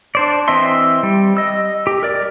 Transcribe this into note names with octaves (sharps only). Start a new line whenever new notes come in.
D4 C5 D5
E3 C4 D#5 E5 C6
G3
D#5 E6
G4
A#4 D5